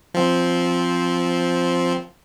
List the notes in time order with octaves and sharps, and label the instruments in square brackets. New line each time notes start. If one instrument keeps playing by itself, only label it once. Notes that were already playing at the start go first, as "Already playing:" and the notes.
[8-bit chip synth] F3 C4